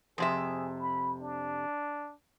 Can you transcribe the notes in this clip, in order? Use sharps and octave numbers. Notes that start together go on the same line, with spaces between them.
F2 C3 G#4 E5
B5
D4